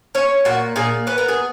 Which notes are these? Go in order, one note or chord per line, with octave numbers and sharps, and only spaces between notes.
C#4 C#5
A#2 F#4
A#2 G#4
B3 B4
A#4
G#4